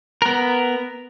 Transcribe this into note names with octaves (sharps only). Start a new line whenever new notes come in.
B3 A#4